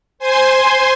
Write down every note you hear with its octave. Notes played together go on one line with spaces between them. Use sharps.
C5 G#5 C6